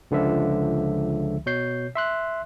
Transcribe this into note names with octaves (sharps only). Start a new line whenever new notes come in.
C#2 D3 F3 E5
B2 C#5 G6 C7
E5 C6 F#6